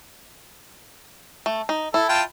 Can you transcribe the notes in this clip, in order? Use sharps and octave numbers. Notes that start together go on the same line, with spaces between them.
A3
D#4
E4 A4
F4 G5 A5